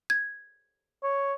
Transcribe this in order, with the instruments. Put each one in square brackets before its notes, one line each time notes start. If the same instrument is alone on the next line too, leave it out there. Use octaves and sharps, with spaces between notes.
[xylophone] G#6
[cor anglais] C#5